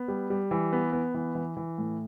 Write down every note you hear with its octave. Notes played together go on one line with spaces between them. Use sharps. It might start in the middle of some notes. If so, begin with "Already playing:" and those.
Already playing: B3
G3
G3
E3
B3
B3
E3
E3
E3
A2